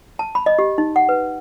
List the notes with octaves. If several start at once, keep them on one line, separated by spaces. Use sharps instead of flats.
A5
B5
D#5
G4
D#4
F#5
B4